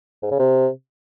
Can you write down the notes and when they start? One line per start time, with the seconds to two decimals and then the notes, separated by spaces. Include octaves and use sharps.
0.22 G#2
0.31 C#3
0.39 C3